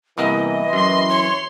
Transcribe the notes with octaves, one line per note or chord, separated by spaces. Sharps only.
C2 E3 A#3 B3 D#5
F#2 C6
C#5